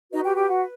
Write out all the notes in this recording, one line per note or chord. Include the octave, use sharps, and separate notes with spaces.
D#4 F#4 B4 D#5
G4 G5
G4 G5
F#4 F#5